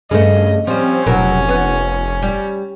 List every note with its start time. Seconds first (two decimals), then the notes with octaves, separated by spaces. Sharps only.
0.11 G2 C#3 A3 D#5
0.67 F3 G3 C4 C#4
1.06 F1 B2 F#3 A#4
1.49 B3
2.22 G3